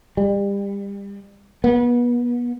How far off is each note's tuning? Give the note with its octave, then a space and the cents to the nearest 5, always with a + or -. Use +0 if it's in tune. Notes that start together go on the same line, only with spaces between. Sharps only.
G3 +30
B3 -30